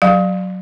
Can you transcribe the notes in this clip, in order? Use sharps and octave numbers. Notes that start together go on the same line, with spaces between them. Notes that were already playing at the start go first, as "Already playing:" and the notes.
F#3 F5